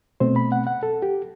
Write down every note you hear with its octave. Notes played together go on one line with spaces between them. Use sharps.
B2 A3 C4 C5
B5
F#5
F#5
A4
G4